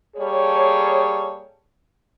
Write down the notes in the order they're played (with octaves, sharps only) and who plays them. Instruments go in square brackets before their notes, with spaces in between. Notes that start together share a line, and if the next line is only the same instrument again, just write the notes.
[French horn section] G3 A#3 G#4 A4 C#5